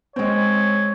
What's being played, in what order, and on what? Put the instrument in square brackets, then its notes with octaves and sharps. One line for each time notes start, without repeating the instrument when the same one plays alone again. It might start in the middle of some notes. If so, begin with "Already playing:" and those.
[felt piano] G#3 C4 [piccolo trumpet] C#5